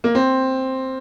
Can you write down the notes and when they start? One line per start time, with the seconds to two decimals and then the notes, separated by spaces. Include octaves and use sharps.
0.04 A#3
0.15 C4